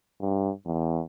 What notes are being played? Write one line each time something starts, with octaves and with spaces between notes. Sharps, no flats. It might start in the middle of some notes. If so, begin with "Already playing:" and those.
G2
E2